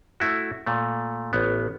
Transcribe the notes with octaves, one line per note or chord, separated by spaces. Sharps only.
A3 E4 F#4
A#2 A3
A1 B3